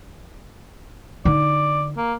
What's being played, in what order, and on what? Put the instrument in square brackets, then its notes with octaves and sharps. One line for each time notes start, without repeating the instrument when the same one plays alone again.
[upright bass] D3 D#4 [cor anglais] D5
[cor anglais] A#3